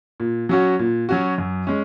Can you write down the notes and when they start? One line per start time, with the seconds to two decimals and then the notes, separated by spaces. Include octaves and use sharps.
0.20 A#2
0.49 F#3 C#4 F#4
0.79 A#2
1.09 F#3 C#4 F#4
1.38 F#2
1.67 G#3 C#4